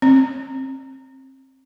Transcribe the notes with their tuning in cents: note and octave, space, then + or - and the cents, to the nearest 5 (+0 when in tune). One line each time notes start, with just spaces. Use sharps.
C4 +25